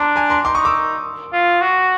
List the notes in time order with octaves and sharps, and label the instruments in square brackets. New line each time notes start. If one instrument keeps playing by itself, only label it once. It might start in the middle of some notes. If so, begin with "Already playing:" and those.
Already playing: [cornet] D4 [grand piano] A#5 C6
[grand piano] G#5 A#5
A#5 C6
[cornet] D#4 [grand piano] C6 D6
[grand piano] C#6 D#6
D6 E6
[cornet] F4
F#4